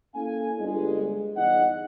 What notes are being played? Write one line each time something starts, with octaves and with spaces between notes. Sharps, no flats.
A#3 C#4 E4 A4 F5 G#5
G1 G#3 G#4
G1 E2 D#4 D#5 F#5